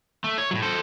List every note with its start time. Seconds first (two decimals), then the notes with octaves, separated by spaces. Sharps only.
0.24 A3
0.38 C#5
0.51 A2 F#3
0.62 A4 C5